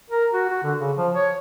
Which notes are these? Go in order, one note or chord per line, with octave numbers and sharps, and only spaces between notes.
A#4
F#4
F#4
D3
C#3
F3
C#5